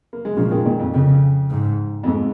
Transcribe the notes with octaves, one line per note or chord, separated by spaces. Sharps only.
A#3
G#3
A#2 C#3 F3
D#3 G#3
A#2 D#3
F2
F2 C#3
G#2
F2
G#2